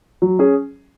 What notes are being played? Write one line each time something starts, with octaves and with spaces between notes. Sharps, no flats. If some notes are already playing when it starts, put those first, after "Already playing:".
F#3
C#4 G#4